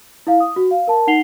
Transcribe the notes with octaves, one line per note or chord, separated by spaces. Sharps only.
E4 F5
D#6
F#4
F5
A#4 A5
D#4 F#5 C7 F7 G7